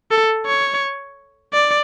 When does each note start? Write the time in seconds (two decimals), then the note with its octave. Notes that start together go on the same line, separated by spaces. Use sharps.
0.11 A4
0.46 C#5
1.53 D5